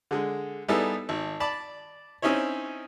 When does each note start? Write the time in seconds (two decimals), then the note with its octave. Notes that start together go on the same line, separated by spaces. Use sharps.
0.11 D3 G#3
0.68 G3 B3 D#4 E4 G#4 A4
1.09 G#1
1.40 D5 A5 B5
2.22 C4 C#4 D#4 E4 C#5